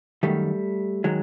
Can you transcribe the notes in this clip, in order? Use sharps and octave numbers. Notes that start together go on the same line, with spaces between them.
F#2 D#3 G3 A3
D#3 F#3 G#3